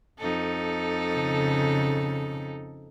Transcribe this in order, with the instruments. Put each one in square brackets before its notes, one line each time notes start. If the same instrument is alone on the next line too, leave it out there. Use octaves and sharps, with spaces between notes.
[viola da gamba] F2 D#4 A4
[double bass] C#3